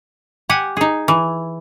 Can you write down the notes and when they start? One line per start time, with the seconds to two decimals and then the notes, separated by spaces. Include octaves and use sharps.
0.49 G4 F#5 G#5
0.77 D#4 G#4
1.08 E3